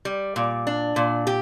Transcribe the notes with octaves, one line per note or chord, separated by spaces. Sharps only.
G3
A#2
D4
A#2
G4